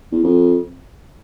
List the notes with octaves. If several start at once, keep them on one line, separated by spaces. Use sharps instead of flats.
E2
F2